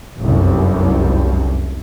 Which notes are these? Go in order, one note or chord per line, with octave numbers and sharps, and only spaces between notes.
F1 C2 F#2